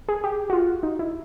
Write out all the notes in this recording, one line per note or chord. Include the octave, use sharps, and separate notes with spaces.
G#4
G4
F#4
F4
D#4
E4